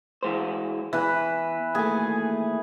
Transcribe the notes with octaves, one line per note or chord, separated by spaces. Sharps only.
E3 G#3 C5
E2 E3 B4
D#2 A3 G#4